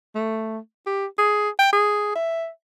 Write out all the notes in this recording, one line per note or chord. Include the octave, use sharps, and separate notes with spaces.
A3
G4
G#4
G5
G#4
E5